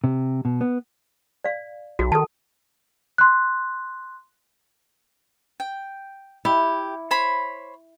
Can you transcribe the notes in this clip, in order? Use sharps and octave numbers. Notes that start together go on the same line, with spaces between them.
C3
B2
B3
D5 F5
B1 F#4
D#3 A4 A5
C6 F#6
G5
E4 G4
C5 C#5 B5